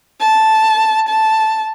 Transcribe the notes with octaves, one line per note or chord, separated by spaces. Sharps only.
A5
A5